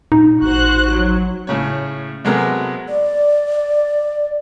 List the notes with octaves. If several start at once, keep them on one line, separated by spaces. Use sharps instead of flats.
A#2 D#4
A1 F#4 C5 F#6
F#3
A2 C#3 C#5
C3 F#3 G#3 A3 B3 A#4
D5